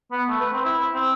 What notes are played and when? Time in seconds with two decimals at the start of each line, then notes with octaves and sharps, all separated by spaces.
0.11 B3
0.29 A3
0.40 B4
0.53 C4
0.65 E4
0.93 C4